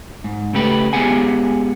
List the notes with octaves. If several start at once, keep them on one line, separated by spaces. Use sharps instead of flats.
G#2
C#3 A3 G4 B4
G#3 B3 G4 G#4 F#5 G#5